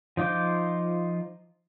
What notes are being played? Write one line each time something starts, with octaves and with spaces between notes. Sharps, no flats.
F3 D#4 F4 D6 G6